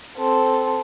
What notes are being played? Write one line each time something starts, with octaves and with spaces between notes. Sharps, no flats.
C4 A4